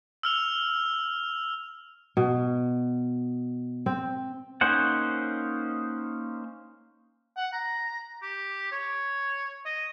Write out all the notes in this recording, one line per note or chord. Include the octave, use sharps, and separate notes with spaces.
E6 F6 F7
B2
C4
A#3 C#4 D#4 C5 F#5
F#5
A#5
G4
C#5
D#5